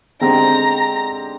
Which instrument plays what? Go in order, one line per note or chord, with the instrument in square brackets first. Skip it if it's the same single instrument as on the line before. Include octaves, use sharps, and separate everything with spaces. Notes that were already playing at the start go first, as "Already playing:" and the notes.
[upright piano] D3 G#3 C4 G4 [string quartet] A#5